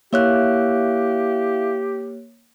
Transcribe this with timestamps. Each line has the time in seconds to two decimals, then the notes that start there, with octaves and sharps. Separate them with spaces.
0.13 A#3 E4 G4 C#5 E5 F5 F#6